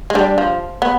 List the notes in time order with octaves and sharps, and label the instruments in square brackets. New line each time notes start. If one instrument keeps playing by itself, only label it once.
[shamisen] G#3
[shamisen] G3 [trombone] D4
[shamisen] F3
B3